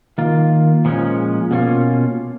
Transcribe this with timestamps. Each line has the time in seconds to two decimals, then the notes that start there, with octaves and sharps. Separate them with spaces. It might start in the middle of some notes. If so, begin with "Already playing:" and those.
0.18 D#3 A#3 F4
0.85 A#2 F3 G#3 C#4
1.51 B2 A#3 C#4 F4